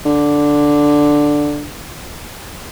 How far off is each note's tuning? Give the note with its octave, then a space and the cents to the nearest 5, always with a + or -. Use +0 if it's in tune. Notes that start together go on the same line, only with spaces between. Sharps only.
D3 +0